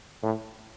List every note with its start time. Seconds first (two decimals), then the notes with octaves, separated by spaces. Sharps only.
0.22 A2